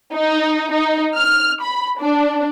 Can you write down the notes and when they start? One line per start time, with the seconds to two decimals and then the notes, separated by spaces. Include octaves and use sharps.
0.14 D#4
0.72 D#4
1.16 F6
1.62 B5
1.99 D4